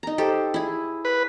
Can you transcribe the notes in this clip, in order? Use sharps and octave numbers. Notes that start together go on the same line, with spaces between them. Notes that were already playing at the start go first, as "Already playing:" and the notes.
D#4 A#5
G4 A4 C5
E4 G#4
B4